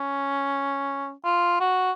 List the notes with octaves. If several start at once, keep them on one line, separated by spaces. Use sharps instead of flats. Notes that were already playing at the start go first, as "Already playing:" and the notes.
Already playing: C#4
F4
F#4